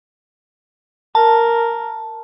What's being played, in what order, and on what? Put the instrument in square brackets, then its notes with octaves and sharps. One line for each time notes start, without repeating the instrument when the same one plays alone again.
[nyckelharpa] A#4 [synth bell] A5